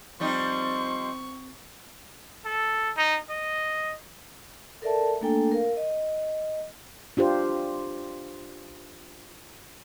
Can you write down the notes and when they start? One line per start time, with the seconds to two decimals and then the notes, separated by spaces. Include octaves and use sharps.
0.20 F3 G3 C4 D#4 C6 C#6
2.45 A4
2.97 D#4
3.30 D#5
4.82 A4 A#4 D5 E5 A5
5.21 A3 A#3 D4 A4 G5 G#5
5.51 A#4 F5
5.77 D#5
7.17 D4 F4 G4 C5